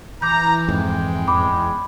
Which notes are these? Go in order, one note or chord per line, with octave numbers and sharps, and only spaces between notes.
E3 A#5 D6 G6
F2 G#2 G#3 G5
E2 B5 D6